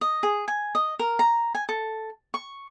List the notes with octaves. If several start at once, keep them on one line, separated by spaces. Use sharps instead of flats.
D#5
G#4
G#5
D#5
A#4
A#5
G#5
A4
C#6